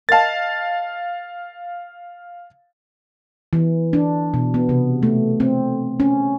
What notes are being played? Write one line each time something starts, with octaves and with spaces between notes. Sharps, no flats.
A#4 D#5 F5 A5 A6
E3
D4
B2
B3
C3
A3
C4
C#4